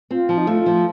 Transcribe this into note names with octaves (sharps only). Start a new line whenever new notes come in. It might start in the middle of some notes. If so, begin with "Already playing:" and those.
C4 F4
F3
D#4
A3 F4
F3